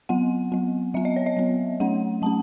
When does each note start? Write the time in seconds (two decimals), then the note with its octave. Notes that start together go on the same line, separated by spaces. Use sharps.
0.09 F#3 B3 F#5
0.52 F#3 B3
0.94 F#3 B3 E5
1.05 D#5
1.16 C#5
1.26 D#5
1.37 F#3 B3
1.80 F#3 A3 C#4 F#5
2.22 F#3 A3 C#4 A5